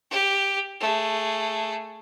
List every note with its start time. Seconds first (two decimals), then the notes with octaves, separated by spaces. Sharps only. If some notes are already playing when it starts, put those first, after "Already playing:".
0.11 G4
0.80 A3 G#4